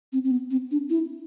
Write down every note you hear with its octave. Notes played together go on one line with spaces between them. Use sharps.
C4
C4
B3
C4
D4
E4